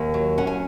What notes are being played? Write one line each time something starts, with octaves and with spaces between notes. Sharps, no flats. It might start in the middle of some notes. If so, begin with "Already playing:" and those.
Already playing: D#2
F#3
C#4 F#5
G#5